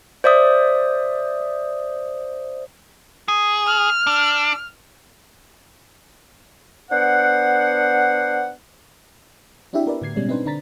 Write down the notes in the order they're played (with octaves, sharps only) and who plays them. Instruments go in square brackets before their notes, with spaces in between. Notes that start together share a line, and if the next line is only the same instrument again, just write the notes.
[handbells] C5 D5 E5 D#6
[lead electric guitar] G#4
[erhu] F6
[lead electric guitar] D4
[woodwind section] B3 D4 C5 F#5
[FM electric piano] C4 D4 E4 F#4 G4 E5
B3 A#4 B4 D5
A2 D3 G#6 C7
B2 G3 G#3 C#4
C4 D4 D#4 B4 C5
D3 D4 A#5 A6 B6